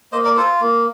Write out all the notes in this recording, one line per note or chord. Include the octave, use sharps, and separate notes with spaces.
A#3 C5 D#5
A#4 D5
F4 A4 C5
A#3